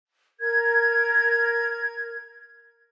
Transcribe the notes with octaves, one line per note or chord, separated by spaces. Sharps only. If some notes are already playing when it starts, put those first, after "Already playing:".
A#4 G#6